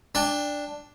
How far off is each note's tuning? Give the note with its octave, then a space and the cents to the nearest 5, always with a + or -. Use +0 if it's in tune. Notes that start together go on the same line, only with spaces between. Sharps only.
D4 +0 G5 +30